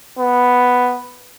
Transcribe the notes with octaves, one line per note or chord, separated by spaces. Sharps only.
B3